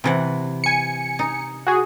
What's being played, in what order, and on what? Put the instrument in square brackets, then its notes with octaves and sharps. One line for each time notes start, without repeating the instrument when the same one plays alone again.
[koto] C3 E3 F#5
[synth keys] G#5 C#7
[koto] D#4
[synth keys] F#4 G#4